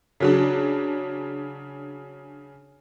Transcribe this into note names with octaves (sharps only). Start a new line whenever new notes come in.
C#3 F#3 D4